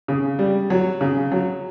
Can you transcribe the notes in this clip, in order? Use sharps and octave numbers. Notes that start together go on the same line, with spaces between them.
C#3
G3
F#3
C#3
F#3